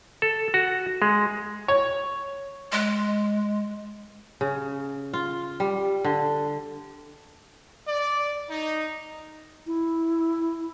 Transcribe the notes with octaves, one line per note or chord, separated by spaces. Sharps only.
A4
F#4
G#3
C#5
G#3
C#3
F4
G3
D3
D5
D#4
E4